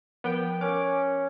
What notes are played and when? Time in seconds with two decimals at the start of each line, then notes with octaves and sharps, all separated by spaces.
0.24 F3 B3 A#4 G5
0.61 C#4 A#4 D6